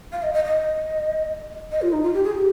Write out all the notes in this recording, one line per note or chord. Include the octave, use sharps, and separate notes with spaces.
F5
D#5
D#5
D#5
D#5
F4
D#4
F4
G4
G#4
G4